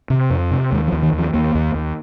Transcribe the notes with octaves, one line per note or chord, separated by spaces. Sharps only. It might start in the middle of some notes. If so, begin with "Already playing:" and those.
C3
F2
C3
D#2 G#3
F3
D#2
D#3
D#2
F3
D#2 A#3
D#2
D#2